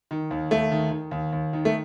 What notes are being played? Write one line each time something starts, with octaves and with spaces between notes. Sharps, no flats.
D#3
D#2
D#2 A3
D#3
D#3
D#2
D#2
D#3
A3